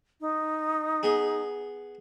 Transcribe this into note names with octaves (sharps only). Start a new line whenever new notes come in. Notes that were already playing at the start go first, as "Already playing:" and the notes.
D#4
B3 G#4